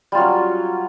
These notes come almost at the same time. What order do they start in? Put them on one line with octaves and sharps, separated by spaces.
G3 F4 F#3 C#4